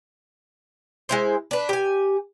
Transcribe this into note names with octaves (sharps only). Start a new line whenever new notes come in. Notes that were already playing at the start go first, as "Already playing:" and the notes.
G#3 E4 C5
D4 B4
G4 G#5